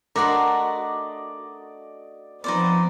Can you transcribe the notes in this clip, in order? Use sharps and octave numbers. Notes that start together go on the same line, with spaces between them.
A3 D4 F#4 A#4 D5 D#5 C6
F3 B3 C4 D#4 C5 D5